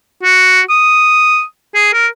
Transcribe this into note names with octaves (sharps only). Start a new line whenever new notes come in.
F#4
D#6
G#4
A#4